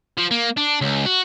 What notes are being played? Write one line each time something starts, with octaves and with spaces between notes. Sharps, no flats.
F3
A#3
D4
C#2
F#4